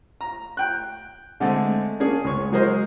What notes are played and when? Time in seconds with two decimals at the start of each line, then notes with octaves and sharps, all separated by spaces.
0.21 A#5
0.57 G5 F#6
1.40 D3 G#3 A3 C4
2.00 A#3 C#4 D4 G#4
2.24 C#2 C#5
2.52 F#3 G#3 G#4 A#4 C5 D#5